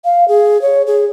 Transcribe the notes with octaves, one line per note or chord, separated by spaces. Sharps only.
F5
G#4
C#5
G#4